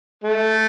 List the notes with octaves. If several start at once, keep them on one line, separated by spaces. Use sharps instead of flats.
A3